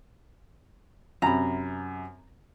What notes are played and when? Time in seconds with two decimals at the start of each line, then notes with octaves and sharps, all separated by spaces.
1.22 F#2 C3 A#5 B5